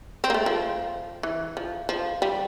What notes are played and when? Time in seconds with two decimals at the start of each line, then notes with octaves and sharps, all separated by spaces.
0.24 C4
0.30 A#3
0.34 A3
0.46 F3
1.23 E3
1.57 F3
1.89 F3
2.22 G3